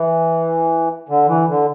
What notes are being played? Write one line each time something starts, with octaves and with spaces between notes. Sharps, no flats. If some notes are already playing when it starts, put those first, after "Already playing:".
Already playing: E3
D3
E3
D3